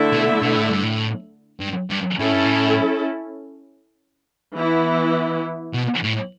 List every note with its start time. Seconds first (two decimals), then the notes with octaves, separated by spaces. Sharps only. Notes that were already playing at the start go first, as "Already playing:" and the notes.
Already playing: D3 A3 E4 A4 E5
0.13 B2
0.42 B2
0.56 A2
0.70 G2
0.83 A2
1.60 G2
1.90 G2
2.19 A2 C#4 E4 A4
2.32 G2
2.45 A2
4.55 E3 B3 E4
5.73 B2
6.03 A2